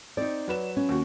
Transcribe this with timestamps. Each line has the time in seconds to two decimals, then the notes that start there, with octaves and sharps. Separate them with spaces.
0.17 C4 D#4 D5
0.48 F#3 B4 E7
0.77 C#4
0.89 D#2 F#4